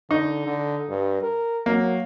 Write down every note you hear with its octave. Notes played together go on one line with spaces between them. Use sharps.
D3 D#4
D3
G2
A#4
F#3 A#3